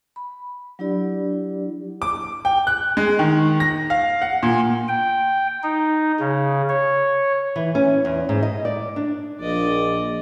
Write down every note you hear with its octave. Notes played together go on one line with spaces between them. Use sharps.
B5
F#3 D4 E4 G4 D5
D6
G5
F#6
G#3
D#3
A#6
F5
F#5
A#2
G5
D#4
C#3
C#5
E3
C#4
E2
G#2
D#5
D5
D4
A#1 D5 D#5